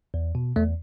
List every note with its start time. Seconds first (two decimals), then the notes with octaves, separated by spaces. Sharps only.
0.14 E2
0.35 B2
0.56 E2 A3